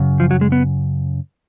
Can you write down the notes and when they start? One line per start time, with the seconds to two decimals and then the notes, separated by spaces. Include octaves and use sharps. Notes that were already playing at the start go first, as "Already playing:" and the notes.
Already playing: F#2 C#3
0.20 F3
0.31 F#3
0.41 G#3
0.52 B3